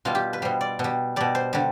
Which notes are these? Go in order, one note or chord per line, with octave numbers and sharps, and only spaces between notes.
B2 G3 F4
G4
B4
B2 G3 C5
D5
B2
G3
B2 G3 D5
C5
D3 G3